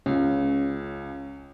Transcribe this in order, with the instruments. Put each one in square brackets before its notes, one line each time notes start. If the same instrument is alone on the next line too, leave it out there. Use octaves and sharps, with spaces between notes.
[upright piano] C#2 [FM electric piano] C#4